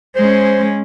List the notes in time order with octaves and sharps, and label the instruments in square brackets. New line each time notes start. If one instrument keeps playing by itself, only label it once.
[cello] G#3 C#4 [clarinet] C5